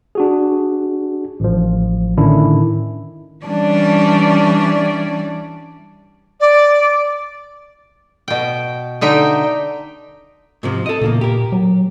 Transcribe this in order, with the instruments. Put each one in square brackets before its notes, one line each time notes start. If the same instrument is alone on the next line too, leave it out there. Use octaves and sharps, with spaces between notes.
[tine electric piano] D4 F#4 G#4
A1 F3
A2 D3 D#3 C#4 D4 E4
[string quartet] E3 G3 C#4 D4 D5
[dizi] D5
[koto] B2 G5
D3 D#4 E5 G5
[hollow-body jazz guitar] G#2 C3 F3
A4 D#5
[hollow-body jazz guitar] E2 C#3 A#3 [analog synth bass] A#2
[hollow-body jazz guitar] G4 A#4
[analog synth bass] F#3